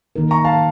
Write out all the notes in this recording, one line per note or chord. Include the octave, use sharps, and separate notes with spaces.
D#3 A#3 D#4 A#4
A#5 C#6
F5 A5